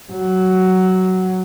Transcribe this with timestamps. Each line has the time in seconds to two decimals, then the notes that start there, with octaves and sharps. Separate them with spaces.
0.13 F#3